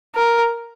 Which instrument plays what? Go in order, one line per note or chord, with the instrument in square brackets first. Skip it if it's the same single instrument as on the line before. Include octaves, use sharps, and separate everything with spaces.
[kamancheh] A#4